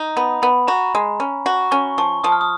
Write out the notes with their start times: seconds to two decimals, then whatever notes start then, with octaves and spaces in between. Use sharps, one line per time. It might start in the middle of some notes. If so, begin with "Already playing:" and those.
Already playing: D#4
0.17 B3 B5
0.42 B3 B5
0.67 F#4 A#5
0.95 G#3
1.20 C#4
1.46 F#4
1.71 C#4 C#6
1.98 F3 C#6
2.24 F3 D#6
2.32 F6
2.41 D#6